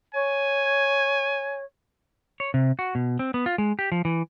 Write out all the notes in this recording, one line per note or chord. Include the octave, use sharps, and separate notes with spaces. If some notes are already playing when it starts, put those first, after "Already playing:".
C#5 G#5
C#5
C3
F#4
B2
C4
B3
F4
G#3
G4
F3
E3